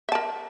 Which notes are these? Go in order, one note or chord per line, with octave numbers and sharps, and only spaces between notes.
A#4 E5 A5